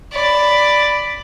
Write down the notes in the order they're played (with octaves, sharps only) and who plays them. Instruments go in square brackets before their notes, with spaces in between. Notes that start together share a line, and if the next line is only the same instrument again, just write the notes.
[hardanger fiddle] D5 B5